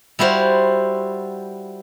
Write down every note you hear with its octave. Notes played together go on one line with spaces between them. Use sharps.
G3 E4 F#4 C5 F5